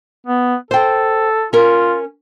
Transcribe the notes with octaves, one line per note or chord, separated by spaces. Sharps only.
B3
A4 C5 G5
C#4 F4 A#4